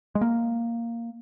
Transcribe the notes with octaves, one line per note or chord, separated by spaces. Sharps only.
G#3
A#3